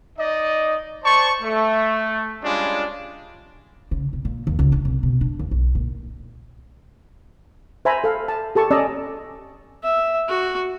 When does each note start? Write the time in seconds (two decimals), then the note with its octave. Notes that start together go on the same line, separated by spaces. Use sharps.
0.18 D#4 D5 D#5
1.04 C5 D5 A5 C#6
1.42 A3
2.43 G3 G#3 C#4 D4 F4
3.91 C#3
4.13 B2
4.25 A#2
4.47 D#2
4.59 C#2
4.72 D4
4.85 C2
5.03 B2
5.21 D4
5.39 D#2
5.51 B1
5.75 A#2
7.85 C5 E5 G#5 A#5 B5
8.04 A4 F5
8.28 A5
8.55 G4 A4 A5 C#6
8.71 C#4 D5 D#5 A5 A#5 E6
9.83 E5
10.28 F#4